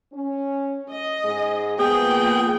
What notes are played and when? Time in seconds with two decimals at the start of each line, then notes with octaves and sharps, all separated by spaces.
0.13 C#4
0.90 D#5
1.24 G#2 G#4
1.79 F3 A#3 B3 G#4 G5